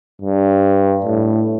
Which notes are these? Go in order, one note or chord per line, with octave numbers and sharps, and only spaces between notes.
G2
A2